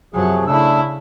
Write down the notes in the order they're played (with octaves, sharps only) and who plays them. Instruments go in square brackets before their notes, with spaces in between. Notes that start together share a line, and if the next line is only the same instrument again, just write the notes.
[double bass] F#2 F#3 [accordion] C3 F3 G#4
[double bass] C#3 E4 [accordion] A3 D4 E6